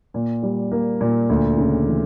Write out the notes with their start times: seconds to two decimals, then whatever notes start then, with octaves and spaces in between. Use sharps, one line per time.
0.14 A#2
0.43 G3
0.71 A#3
1.01 A#2
1.29 D2
1.58 C#3
1.87 E3